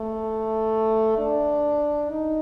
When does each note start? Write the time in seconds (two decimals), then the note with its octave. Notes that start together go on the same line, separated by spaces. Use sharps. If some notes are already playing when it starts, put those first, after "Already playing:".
Already playing: A3
1.18 D4
2.10 D#4